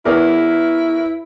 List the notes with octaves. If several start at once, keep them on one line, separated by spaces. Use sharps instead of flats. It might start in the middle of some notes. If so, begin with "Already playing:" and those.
E2 E4 G#4 A#4 B4 C#5 D6